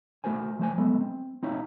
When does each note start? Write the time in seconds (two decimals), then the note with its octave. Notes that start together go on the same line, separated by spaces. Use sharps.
0.24 A3 F#4 A#4 C5 G#5
0.59 F3 A3 C5 G#5
0.78 F#3 G#3 A3 B3
1.01 C4
1.43 C4 D#4 E4 C#5 F5